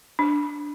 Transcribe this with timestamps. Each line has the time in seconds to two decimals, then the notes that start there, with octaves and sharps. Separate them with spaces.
0.19 D4